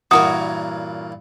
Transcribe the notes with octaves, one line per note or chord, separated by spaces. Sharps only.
G2 A#2 E3 F#4 A#4 C#5 D#6